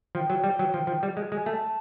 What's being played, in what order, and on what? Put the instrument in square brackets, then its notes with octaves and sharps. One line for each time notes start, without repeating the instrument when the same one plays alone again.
[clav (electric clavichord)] F3 [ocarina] G5
[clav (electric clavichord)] F#3
G3
F#3
F3
F3
G3
G#3
G#3
[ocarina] G#5
[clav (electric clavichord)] A3 [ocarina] A5